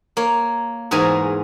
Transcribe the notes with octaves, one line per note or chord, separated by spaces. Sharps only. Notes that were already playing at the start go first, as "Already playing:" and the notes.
A#3 C#5
E2 G#2 G#4 A#4 G#5 A#5